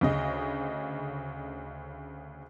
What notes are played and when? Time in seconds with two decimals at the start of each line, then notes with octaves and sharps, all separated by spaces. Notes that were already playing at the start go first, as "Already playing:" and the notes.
0.01 D2 C#3 D#5